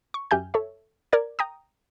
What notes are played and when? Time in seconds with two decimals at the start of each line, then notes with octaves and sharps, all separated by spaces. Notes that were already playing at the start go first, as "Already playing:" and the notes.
0.14 C#6
0.31 F#2 G4 E5 G#5 F6 G6
0.54 A4 C#5 E5
1.13 A#4 D5 G#6
1.39 G5 A#5 D#6